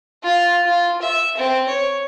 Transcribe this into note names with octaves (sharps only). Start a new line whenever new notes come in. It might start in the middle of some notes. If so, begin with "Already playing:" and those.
F4
F4
E5
C4
C#5